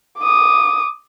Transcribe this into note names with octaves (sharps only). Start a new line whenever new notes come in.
D6 D#6